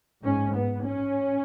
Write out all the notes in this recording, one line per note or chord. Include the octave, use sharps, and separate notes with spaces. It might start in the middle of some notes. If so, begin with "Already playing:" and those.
G#2 C#4
B3
C#4